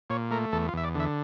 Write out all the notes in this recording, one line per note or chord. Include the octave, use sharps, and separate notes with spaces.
A#2 C#5
A3 A#4
E2 A4
F4
E2 E5
D5
D3 E5